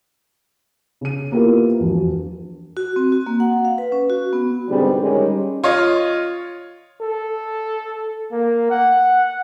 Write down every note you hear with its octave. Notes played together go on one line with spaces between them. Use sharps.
C#3 D#7
A#3 B3 E4 F4 G4 A#4
E1 F2
F#4
C4
F#4
A#3
F#5
F5
B4
C#4
F#4
B3
G#2 B2 D3 G3 C4 G#4
D#3 G3 G#3 C#4
F4 C#5 D#5
A4
A#3
F#5